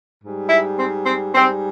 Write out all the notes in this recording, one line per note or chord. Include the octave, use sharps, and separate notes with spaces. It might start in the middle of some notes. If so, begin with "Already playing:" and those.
G#2 G3
E4
C4
C4
G#2 G3 C4